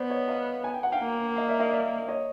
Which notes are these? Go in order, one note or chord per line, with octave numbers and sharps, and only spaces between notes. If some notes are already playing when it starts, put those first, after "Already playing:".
Already playing: B3 C5 D5
C#5 D#5
D#5 F5
G#5
G5
F#5
F5 G5
A#3
D#5 F5
D5 E5
D#5 F5
D5 E5
C#5 D#5